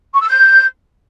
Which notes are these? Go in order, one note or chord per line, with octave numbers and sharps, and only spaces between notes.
C#6
E6
G6